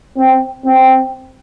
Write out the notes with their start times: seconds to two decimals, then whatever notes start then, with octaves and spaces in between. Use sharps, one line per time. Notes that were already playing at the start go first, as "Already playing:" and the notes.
0.17 C4
0.65 C4